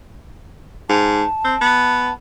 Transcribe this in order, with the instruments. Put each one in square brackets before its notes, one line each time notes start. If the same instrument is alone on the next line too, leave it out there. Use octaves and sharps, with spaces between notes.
[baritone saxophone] G#2 [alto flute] A5
[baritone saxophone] C4
B3